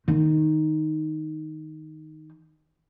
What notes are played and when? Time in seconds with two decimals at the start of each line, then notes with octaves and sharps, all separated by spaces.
0.08 D#3 D#4